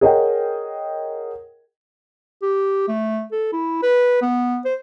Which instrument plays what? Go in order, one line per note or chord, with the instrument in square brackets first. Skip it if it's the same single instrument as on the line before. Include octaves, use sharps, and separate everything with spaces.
[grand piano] G#4 A#4 C#5 D#5 F#5 G5
[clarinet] G4
A3
A4
E4
B4
B3
C5